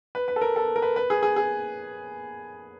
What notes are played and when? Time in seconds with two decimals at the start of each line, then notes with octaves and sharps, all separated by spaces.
0.15 B4
0.28 B4
0.36 A4
0.41 A#4
0.56 A4
0.76 A#4
0.82 B4
0.96 B4
1.10 G#4
1.23 G#4
1.36 G#4